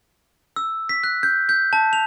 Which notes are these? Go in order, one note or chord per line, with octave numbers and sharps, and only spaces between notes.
E6
B6
F#6
G6
G6
A5
F7